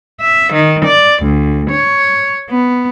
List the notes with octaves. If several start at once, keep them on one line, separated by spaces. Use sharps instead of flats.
E5
D#3
D5
D2
C#5
B3